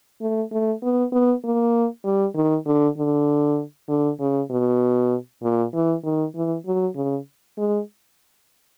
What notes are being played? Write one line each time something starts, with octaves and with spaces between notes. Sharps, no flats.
A3
A3
B3
B3
A#3
G3
D#3
D3
D3
D3
C#3
B2
A#2
E3
D#3
E3
F#3
C#3
G#3